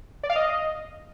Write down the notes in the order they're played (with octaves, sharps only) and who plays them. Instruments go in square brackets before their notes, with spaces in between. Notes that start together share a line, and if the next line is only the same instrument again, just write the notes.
[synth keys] D5
F5
D#5